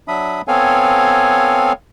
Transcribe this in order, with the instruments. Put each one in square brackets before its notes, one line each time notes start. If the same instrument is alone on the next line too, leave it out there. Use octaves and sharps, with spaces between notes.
[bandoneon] F#3 D4 E5 B5 D#6
B3 C4 A4 C#5 F5 G#5